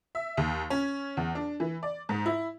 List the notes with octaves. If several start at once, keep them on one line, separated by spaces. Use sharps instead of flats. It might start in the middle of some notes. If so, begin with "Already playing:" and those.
E5
D#2
C#4
E2
D4
E3
D5
G#2
E4